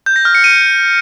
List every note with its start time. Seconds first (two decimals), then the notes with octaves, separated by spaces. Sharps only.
0.06 G6
0.16 A#6
0.25 F6
0.35 C#7
0.44 D#7